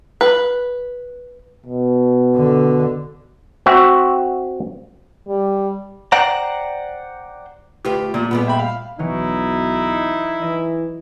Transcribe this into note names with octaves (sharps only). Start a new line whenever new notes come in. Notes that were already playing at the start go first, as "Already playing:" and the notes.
B4
B2
D3
C4 F#4 E5
G3
C5 D5 F#5 G5 A#5
D2 F4 G4 B4
A#2 G3
A#2 G3 G#3 B3
E5 G5 B5
F5
B1 E3 F#3 D#4 E4 C#7
E3 D#5